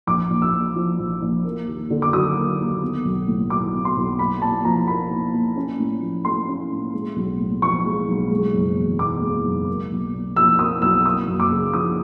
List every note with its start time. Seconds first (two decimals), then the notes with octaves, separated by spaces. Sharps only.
0.07 A#1 D6
0.30 A#1
0.42 E6
0.53 A#2
0.76 F3
0.99 A#1
1.22 A#1
1.44 A#3
1.67 D#2
1.90 D3
2.02 D6
2.13 F#3 D#6
2.36 A#3
2.59 D#2
2.82 B3
3.05 B1
3.27 A2
3.50 F#3 D6
3.73 B3
3.85 C6
3.96 B1
4.19 A#2 B5
4.42 A#2 A5
4.65 F3 A#5
4.88 A#3 B5
5.10 A#2
5.34 A#2
5.56 C#4
5.79 A2
6.02 F3
6.24 A3 C6
6.48 C#4
6.71 A2
6.93 G#3
7.16 B1
7.39 A2
7.62 F3 C#6
7.85 G#3
8.08 B1
8.30 G#3
8.53 F#1
8.76 E2
8.99 B2 D6
9.22 G#3
9.45 F#1
9.68 A#3
9.91 B1
10.13 A#2
10.36 F3 E6
10.59 A#3 D#6
10.82 B1 E6
11.05 A#3 D#6
11.28 F#2
11.40 D6
11.51 C#3
11.74 F3 D#6